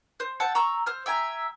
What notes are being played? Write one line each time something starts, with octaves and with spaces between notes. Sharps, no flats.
C5
F#5 G5 A5 E6
A#5 C#6 E6
C5 F6
E5 G5 G#5 A#5